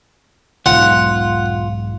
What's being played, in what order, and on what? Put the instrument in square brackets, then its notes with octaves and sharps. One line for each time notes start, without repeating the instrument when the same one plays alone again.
[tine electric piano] B1 E2 G#2 [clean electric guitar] F4 [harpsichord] F#5